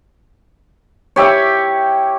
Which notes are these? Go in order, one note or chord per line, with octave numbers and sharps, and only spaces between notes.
E4 G4 C#5